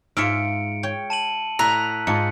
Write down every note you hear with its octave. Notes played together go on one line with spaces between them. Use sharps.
G#2 F4 E5 E6 F6 C#7 D7
C#5 G5
A5 D#7 F#7
A2 A#5 E6 F#6 B6
G#2 D#4 F4 A5 C#7